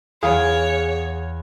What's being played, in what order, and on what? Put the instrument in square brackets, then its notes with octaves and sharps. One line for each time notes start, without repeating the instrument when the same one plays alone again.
[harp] E2 F5 G#6 [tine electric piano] G#4 [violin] C#5